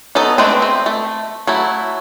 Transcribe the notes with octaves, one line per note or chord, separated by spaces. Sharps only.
F#3 B3 D#4 A4 D#5
G#3 A3 C4 D4 B4
C4
A3
F#3 A3 E4